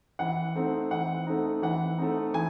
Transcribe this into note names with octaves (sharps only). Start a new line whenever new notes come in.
E3 F#5
A3 C4 D#4
E3 F#5
A3 C4 D#4
E3 F#5
A3 C4 D#4
E3 G#5